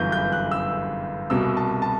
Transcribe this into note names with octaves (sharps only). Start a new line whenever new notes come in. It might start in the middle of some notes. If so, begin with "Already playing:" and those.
Already playing: G1 F#2 E3 G6
G6
F#6
E6
C2 B2 E6
A5
A5